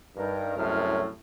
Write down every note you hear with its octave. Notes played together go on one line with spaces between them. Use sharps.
G2 D#4 A#4
C2 F#2 A2 C#3 C5 F6